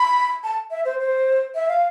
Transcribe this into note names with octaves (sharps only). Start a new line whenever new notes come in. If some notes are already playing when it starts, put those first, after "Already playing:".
Already playing: B5
A5
E5
C5
C5
E5
F5